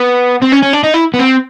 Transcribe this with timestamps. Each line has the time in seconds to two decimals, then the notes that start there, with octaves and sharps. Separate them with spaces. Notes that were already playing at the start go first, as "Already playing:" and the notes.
Already playing: B3
0.42 C4
0.52 C#4
0.62 C#4
0.73 D4
0.84 D#4
0.94 E4
1.14 B3
1.20 C4